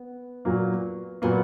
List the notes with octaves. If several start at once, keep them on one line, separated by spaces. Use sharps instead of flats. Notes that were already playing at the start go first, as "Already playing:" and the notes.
Already playing: B3
A#2 F#3 A#3
A#2 F#3 A#3 B3